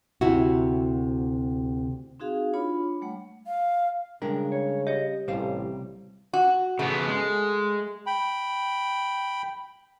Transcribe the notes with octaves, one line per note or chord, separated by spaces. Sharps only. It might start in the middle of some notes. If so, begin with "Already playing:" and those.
D2 C3 E4 F#4
C4 D#4 F#4 G#4 F5
D4 F4 C#5 B5
G3 A3 F#5
F5
C#3 G3 G#3 D4 A#4
C#5
G4 C#5 D#5
A1 C3 G3 C5 F5
F#4
C#3 A3 B3
G#3
G5 B5